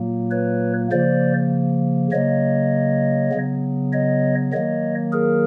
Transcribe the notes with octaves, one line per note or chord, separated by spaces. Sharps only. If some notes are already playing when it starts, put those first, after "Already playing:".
Already playing: A#2 F#3 A#3
B4 C#5
C#3 F3 A#3 C5 D5
C#3 F#3 A#3 C#5 D#5
C#3 F#3 B3
C#5 D#5
D#3 F#3 A#3 C#5 D#5
G#4 A#4